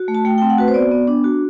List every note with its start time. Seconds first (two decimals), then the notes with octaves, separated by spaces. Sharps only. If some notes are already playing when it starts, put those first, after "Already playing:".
Already playing: F#4
0.08 A3
0.15 A5
0.25 A3 G5
0.38 G5
0.42 C4
0.50 F#5
0.58 F#4 B4
0.68 C5
0.74 B3 D5
0.91 B3
1.07 D4
1.24 F#4